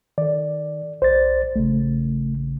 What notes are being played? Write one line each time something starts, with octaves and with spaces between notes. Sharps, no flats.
D#3 A4 D5
B1 C5 D5 A6
A1 C#3 A3